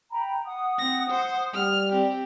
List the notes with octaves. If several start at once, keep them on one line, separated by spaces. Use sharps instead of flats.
G5 A#5 B5
F#5 D#6
C4 A#6
C5
G3 F6
C4 G4